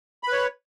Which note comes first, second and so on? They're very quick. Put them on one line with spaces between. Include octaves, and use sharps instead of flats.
B5 B4 C#5